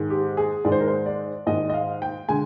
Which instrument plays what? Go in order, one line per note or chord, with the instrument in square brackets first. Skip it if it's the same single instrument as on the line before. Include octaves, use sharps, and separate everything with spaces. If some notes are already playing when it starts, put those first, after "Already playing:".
Already playing: [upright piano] G#2 D#3 G#3
G4
G#4
G#2 D#3 G#3 D5
C5
A#4
C5
D5
G#2 D#3 G#3 D#5
D#5
F5
G5
D3 G#3 G#5